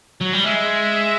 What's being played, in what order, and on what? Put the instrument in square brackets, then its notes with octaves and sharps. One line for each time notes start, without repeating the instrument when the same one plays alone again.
[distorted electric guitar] F#3
G3
[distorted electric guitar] G#3 [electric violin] E5